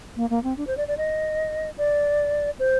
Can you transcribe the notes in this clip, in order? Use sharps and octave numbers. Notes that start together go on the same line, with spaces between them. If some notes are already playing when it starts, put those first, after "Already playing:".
A#3
A#3
C4
D4
C5
D5
D5
D#5
D5
C5